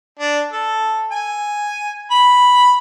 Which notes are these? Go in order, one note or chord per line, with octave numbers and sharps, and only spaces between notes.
D4
A4
G#5
B5